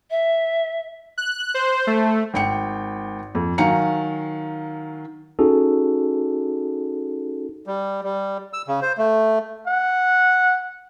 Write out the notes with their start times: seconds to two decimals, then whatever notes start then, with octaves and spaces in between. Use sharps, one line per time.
0.10 E5
1.18 F#6
1.54 C5
1.87 A3
2.34 G#1 G5 C#7
3.35 F2
3.58 D#3 F#3 F5 G#5 A#5 C#7
5.39 C#4 D#4 F#4 G#4 A4
7.67 G3
8.04 G3
8.53 E6
8.68 C#3
8.82 C5
8.98 A3
9.67 F#5